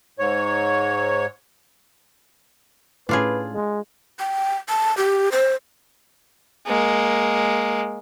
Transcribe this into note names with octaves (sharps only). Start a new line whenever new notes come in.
G#2 C#5
A2 C#4 D4 F4 G#4 B4
G#3
G5
A5
G4
C5
G#3 A#3